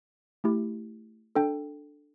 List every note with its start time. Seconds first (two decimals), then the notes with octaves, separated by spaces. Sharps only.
0.44 A3 E4 G4
1.35 D4 A4 G5